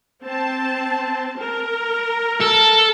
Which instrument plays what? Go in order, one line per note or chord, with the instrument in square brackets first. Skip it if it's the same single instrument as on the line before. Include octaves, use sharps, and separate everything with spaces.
[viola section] C4 A5
A#4
[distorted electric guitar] A4